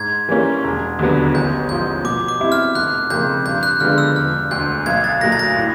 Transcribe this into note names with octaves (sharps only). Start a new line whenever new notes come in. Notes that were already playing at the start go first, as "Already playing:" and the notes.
Already playing: G#2 G#6
E3 G3 A#3 C#4
E1
D#2 D3 F#3 B3
A1 G6
G#2 F3 G6
B2 D6
D6
G3 C4 E4
F6
F1 F#6
F2 C#3 F3 A#3 G6
G2 G6
F#6
D3 F3 G#3 B3 F6
E6
E1 F6
D2 D3 G6
B1 G#6
A6
A#2 F#3 A3 A#6
A6
A#6
A2